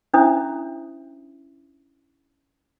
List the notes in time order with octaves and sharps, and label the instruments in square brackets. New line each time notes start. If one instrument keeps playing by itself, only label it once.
[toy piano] C#4 D4 E4 C5 E5 D#6